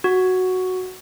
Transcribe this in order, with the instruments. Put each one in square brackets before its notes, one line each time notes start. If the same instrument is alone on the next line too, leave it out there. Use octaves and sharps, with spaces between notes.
[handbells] F#4